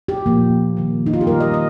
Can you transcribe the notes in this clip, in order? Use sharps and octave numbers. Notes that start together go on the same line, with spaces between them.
G4
A#2 F3 A#3
D#3 A#3
D#4
F4
G4
D#3 G3 A#3 A#4
D#5
D#5